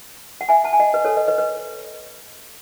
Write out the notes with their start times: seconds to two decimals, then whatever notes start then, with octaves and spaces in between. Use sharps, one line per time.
0.41 F#5
0.49 E5 G#5
0.64 F#5 A5
0.73 G#5
0.80 D#5 F#5
0.94 B4 D#5
1.05 A4 C#5
1.17 B4 D#5
1.28 B4 D#5
1.38 B4 D#5